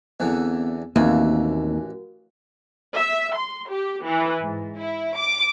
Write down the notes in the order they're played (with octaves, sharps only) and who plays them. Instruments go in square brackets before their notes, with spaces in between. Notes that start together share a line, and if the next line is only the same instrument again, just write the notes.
[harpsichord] E2 D3 E3 [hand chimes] B3 C4
[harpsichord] A1 E3 [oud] D#2 [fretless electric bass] A#3 C4 [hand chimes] F#4 A#4
[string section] E5
C6
G4
E3
G#2
E4
D6